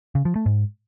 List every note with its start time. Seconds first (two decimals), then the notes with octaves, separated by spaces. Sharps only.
0.15 C#3
0.25 F3
0.36 A3
0.46 G#2